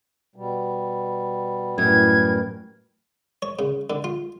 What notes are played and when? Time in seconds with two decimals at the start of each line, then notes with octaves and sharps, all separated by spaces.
0.36 B2 G3
1.78 F#2 A2 E3 G3 A#4 G#6
3.42 C#5
3.59 C#3
3.90 D3
4.04 F4